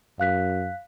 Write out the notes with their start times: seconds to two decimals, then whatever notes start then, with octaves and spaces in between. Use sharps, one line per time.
0.20 F#2 F5 F#6 B6